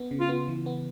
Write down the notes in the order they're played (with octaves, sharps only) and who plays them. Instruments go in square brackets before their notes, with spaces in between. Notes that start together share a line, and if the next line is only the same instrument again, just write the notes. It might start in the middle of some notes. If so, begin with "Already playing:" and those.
Already playing: [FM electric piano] B3
C#3
[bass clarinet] F4
[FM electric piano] B3
E3
B3